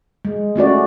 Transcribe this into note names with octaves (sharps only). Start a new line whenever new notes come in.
G#3
A3 C#4 F#4 D5